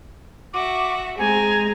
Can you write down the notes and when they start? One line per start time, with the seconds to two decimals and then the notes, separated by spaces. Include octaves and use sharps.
0.54 F#4 E5 D6
1.19 G#3 C4 G#5 A#5